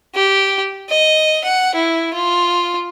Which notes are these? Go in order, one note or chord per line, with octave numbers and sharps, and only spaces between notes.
G4
D#5
F#5
E4
F4